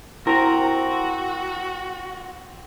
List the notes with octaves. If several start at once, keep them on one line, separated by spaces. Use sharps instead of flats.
C4 E4 F#4 A#4 A#5